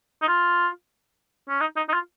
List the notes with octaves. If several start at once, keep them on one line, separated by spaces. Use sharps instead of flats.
D#4
F4
C#4
D#4
D#4
D#4
F4